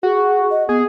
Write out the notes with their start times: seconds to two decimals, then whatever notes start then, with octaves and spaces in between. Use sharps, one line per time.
0.03 F#4 G#4
0.51 D#5
0.69 B3 G#4